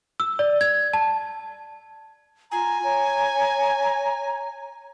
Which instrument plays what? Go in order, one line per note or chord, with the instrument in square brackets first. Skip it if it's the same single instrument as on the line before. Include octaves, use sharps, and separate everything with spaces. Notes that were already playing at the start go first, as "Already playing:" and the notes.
[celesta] E6
D5
G#6
A5
[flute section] F4 A#5 [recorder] G#5
[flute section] C#5 A#5